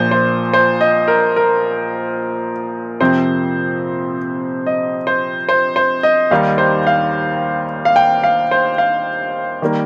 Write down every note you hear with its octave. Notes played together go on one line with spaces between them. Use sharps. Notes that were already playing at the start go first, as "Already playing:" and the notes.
Already playing: A#1 A#2 F3 C5
C5
C5
D#5
A#4
A#4
F2 C3 F3 C4 C5
D#5
C5
C5
C5
D#5
D#2 D#3 G3 D#4 F5
C5
F5
F5
G5
F5
C5
F5
D#3 G3 A#3